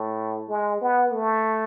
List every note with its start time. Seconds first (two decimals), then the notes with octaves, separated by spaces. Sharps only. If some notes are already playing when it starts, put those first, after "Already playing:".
Already playing: A2
0.49 G#3
0.82 B3
1.13 A3